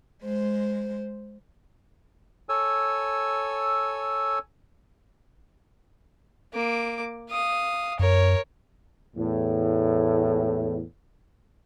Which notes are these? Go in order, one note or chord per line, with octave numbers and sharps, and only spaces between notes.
G#3 C5
A4 C#5 G#5 E6
A#3 D6
F5 D#6
F#2 A#4 C#5
E2 A2